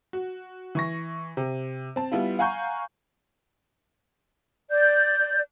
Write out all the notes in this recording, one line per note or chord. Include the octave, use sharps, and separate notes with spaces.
F#4
E3 C#6 A#6
C3
C4 A5
G3 B3 E4 F4
F5 F#5 G#5 A#5 C#6 G6
D5 G6